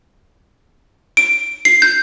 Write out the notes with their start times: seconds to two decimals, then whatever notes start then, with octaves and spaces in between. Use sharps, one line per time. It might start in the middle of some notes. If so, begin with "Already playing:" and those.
1.17 D7
1.65 C7
1.82 G6